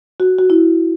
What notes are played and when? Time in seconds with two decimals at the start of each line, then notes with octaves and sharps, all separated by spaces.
0.20 F#4
0.38 F#4
0.50 E4